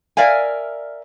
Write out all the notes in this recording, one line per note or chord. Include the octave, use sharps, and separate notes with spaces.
A#4 D5 E5 F5 G#5